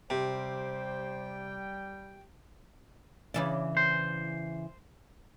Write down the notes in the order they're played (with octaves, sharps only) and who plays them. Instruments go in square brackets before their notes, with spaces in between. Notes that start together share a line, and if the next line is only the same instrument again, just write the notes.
[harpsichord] C3 [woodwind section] G3 G5 [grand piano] G4 [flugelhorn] C5
[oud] C#3 E3 D5
[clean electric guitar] C5